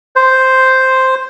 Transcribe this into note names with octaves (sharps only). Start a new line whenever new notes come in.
C5